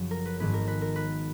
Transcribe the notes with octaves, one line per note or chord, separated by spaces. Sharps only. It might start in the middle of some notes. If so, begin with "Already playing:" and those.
Already playing: F#1 F#2 F3
A#4
B4
G#1 G#2 D#3 G#3 B3 B4
A#4
B4
A#4
B4